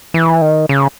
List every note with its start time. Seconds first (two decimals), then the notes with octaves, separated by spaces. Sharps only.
0.14 E3
0.42 D#3
0.69 C#3